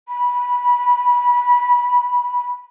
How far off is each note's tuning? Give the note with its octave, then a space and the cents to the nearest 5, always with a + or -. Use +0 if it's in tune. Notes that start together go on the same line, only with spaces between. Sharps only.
B5 -20